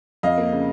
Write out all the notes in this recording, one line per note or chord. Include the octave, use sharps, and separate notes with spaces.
F2 D#5 F5
A#3
C#3